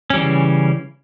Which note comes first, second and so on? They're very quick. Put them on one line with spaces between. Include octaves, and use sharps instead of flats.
C#4 G3 E3 C#3